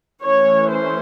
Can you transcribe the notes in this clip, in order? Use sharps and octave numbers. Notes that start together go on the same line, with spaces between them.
E3 A3 C#4 C#5
C5